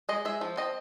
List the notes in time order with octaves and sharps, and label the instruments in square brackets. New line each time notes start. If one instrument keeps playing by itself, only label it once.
[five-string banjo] G#3 D#5
G#3 E5
F3
C4 D#5